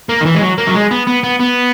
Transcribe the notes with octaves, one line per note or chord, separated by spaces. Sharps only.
A#3
D#3
E3
G#3
F#3
A#3
F#3
G#3
B3
B3
B3
B3